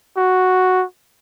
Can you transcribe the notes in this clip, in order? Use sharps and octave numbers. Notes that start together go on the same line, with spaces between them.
F#4